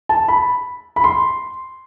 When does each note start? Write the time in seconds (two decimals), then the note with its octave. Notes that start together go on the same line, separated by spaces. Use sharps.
0.09 A5
0.28 B5
0.96 B5
1.04 C6